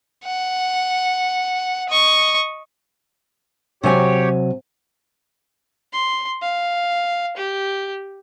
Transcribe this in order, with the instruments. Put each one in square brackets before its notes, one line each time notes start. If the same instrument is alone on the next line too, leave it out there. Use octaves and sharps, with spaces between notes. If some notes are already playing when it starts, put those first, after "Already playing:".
[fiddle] F#5
D#5 C#6
[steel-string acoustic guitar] C3 F#3 G#5 [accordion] G4 C#5
[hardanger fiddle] C6
F5
G4